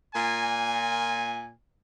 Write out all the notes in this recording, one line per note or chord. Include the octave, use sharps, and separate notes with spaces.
A#2 G#5